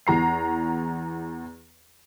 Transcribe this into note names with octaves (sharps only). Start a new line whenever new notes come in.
E2 A#5 C7